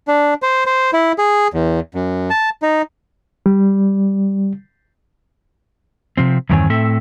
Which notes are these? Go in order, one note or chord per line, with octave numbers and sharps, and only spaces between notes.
D4
C5
C5
E4
G#4
E2
F#2
A5
D#4
G3
C3 F3 C4
E2 G2 D#3 C4 C#5 G#5
A2 C4 A4 E5